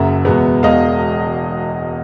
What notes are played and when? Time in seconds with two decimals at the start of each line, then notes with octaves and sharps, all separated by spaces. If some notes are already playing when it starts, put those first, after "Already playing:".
Already playing: F#1 F#2 C#3 E5 F#5
0.25 E2 B2 G#3 B3
0.63 E1 E2 B2 G#3 D#5 F5